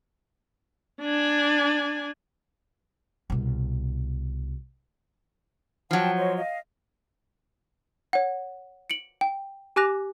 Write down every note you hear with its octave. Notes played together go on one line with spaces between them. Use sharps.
D4 G#5
C2 B2
F3 F#3 F#5 G5 A5
C5 C#5 D#5
D#5 F5
C#5 F#5
C#7 D7 F#7
G5
G4 G#5 D6 F#6 A#6 F7